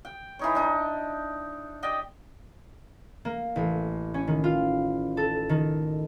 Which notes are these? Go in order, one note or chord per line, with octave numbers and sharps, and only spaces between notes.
G5
E3 D#4 C#5
D4 D#4
G4 D5 D#5 G5
A#3
A1
C#4
D#3
F4
A4
D#3